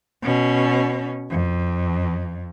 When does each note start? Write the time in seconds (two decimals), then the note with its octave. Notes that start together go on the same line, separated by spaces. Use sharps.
0.23 B2 C#4
1.30 F2